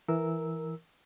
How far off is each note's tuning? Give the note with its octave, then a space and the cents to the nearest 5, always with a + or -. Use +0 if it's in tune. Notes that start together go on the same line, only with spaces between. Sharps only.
E3 +0 A#4 +0 E6 -10